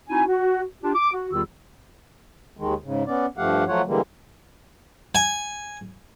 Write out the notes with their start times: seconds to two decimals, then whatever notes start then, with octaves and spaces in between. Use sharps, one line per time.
0.09 C4 D#4 E4 F#4 G#5
0.28 F#4
0.83 D4 F4 G4
0.95 D6
1.13 F#4
1.33 E2 D#3 G3 F4 G4 E6
2.57 D#2 D#3 G#3
2.84 G#2 C#3
3.07 B3 C#4 D5
3.38 G2 F3 A3 G4 F5 F#5
3.68 F3 F#3 A3 F4 C#5 F#5
3.87 D3 E3 G3 G#3 A#3
5.15 G#5